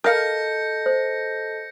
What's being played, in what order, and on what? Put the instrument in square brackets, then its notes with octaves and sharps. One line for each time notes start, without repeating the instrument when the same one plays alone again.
[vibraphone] A4 D#5 A5 [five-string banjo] A#4 F5 [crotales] G6 A#6 C#7
[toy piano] C5